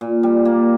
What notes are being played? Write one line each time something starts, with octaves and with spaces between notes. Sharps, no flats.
A#2
G3
A#3